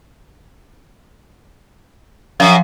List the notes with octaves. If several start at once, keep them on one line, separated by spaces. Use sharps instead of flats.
F#2 F3